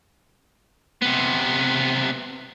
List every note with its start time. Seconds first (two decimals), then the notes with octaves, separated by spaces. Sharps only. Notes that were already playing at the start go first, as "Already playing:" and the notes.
1.02 C3 B3